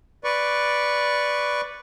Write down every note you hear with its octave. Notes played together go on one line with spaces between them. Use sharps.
B4 D5 C#6